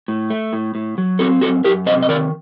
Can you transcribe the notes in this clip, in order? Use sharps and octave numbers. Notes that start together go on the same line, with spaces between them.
A2
A3
A2
A2
F#3
C4 F#4 A4
F#2 F#4 A4
F#2 G4 A#4
C3 C5 D#5
D#5
D#3 A#4 D5